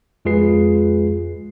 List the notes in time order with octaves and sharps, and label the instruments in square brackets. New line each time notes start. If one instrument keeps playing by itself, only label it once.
[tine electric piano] F2 G#3 F4 G#4 B4 C7